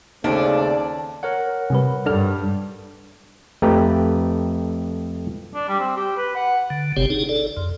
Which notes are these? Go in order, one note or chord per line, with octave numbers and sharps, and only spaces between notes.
D#2 C#3 A3 C4 D4 D5
A#4 C#5 F#5
C3 G3 B4
G2 D4 A4 F6
F2 A3 G4 B4 G5 A#5
D4
G3
C4
G4
B4
F#5
D3
G1 C3 C4 G4 C#5
D4 D#4 G#4
A4 D5
F2